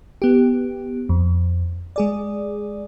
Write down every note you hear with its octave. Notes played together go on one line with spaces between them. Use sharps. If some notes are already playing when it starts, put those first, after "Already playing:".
B3 G4
F2
G#3 G#4 D5